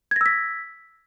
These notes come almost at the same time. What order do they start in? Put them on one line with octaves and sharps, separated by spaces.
G#6 A#6 E6 B6